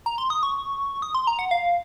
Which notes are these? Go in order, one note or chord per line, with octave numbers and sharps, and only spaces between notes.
A#5
C6
D#6
C#6
D#6
C6
A#5
F#5
F5